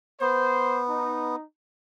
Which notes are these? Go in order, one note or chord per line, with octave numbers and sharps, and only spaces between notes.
B3 C5
D#4